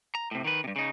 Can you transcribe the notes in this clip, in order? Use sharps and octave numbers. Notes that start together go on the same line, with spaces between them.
A#5
A2 C3
D#3 B4
G2 C3
C#3 D#4